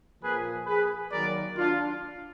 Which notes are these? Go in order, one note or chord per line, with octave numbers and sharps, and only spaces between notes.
A#2 F3 A#3 G#4 B4
G#4 B4
D#3 F#3 A#3 A#4 D5
D4 F4